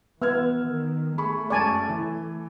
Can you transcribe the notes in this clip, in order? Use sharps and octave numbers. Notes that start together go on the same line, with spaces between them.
E3 B3 E6 F6 G#6
D#3
A3 G#4 B5 C#6
F#2 G#3 D5 G#5 A5 C#6
E3